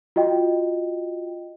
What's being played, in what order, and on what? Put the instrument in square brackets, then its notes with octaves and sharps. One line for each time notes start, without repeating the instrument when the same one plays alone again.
[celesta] F4 F#4 D#5 G5